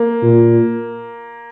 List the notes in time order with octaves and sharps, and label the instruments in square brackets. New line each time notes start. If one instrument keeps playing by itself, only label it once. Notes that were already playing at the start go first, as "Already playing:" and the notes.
Already playing: [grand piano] A#3
[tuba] A#2